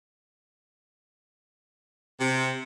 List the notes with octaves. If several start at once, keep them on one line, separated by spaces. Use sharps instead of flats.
C3